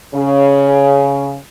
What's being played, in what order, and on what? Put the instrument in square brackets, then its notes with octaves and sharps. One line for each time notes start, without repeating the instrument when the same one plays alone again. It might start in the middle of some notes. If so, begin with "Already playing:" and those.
[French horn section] C#3